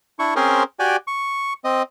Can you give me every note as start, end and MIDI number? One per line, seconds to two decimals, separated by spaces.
0.19 0.34 62
0.19 0.34 64
0.19 0.34 85
0.36 0.63 60
0.36 0.63 61
0.36 0.63 68
0.36 0.63 70
0.36 0.63 72
0.79 0.96 66
0.79 0.96 67
0.79 0.96 74
0.79 0.96 80
1.07 1.53 85
1.64 1.82 60
1.64 1.82 75